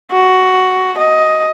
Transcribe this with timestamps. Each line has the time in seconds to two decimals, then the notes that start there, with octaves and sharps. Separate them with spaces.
0.12 F#4
0.98 D#5